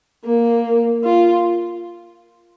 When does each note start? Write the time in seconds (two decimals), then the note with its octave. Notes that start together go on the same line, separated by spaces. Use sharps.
0.25 A#3
1.04 F4